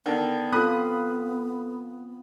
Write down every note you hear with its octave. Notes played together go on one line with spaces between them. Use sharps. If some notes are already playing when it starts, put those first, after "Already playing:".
D3 D#3 B3 G5 A5
C4 F4 A4 A#5 B5 D#6 F#6